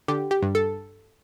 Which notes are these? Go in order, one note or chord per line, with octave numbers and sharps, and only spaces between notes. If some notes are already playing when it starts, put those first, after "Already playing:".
D3 G4
G4
G2
A4